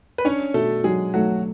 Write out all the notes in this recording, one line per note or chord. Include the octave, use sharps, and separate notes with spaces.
B4
C#4 D4 C#5
B2 A3 A4
F#3 G#3 G#4
F#3 A3 F#4